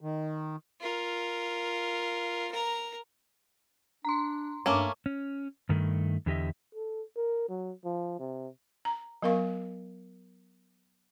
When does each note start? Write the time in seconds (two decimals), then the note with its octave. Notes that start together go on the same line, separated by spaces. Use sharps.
0.01 D#3
0.80 F4 A#4
2.51 A#4 A#5
4.05 D4 A#5 C6
4.66 G2 A3 A#3 C#4 D6
5.06 C#4
5.69 G2 D#3 A3
6.26 E2 D3 G4 D#5 E5
6.75 A4
7.16 A#4
7.49 F#3
7.85 F3
8.19 C3
8.85 A#5
9.22 F#3 B3 A#4 F5 C#6